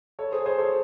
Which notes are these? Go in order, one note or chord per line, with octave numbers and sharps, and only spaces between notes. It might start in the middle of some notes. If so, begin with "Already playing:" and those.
A4 C#5
G#4 C5
G#4 C5
A4 C#5